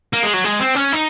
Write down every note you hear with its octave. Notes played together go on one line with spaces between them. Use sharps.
A#3
G#3
F#3
G#3
C4
C#4
D#4